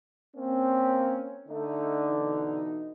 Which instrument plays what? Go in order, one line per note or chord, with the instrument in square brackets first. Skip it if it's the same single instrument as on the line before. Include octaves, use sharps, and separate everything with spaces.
[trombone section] A#3 C#4 [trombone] C4
[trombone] D3 [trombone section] A3 D4 D#4
[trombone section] B2 E3 D#4